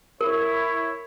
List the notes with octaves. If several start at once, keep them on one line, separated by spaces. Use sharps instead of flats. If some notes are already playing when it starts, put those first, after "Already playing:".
E4 A#4 C#5